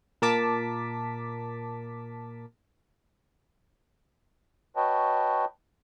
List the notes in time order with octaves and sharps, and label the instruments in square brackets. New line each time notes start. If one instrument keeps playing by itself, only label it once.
[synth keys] A#2 A#4 A5 D6 B6
[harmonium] F#4 B4 C#5 D#5 G5 A5